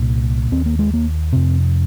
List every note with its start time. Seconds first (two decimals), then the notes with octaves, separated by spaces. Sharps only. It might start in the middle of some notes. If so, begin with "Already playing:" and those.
Already playing: C2 A#2
0.52 D#2 C4
0.66 A#3
0.79 G#3
0.94 A#3
1.33 F2 C3 C4